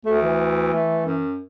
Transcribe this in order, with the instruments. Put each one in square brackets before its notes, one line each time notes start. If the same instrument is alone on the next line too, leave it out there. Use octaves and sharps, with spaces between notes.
[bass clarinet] D2 [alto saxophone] A3
[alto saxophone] E3
[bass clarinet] A3
F#2